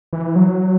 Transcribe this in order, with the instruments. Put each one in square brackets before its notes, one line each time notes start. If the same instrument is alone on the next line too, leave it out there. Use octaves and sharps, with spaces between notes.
[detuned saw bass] E3
F#3